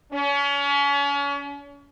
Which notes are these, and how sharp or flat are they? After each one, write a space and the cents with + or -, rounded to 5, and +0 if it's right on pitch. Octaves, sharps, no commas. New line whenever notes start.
C#4 +35